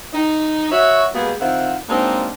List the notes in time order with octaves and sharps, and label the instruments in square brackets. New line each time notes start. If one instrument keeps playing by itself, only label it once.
[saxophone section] D#4
F#4 C#5 E5
B2 G3 G#3 A#3 B3 G#4
D#3 C4 E4 F4 F#5
F#3 G#3 A#3 C4 D4 D#4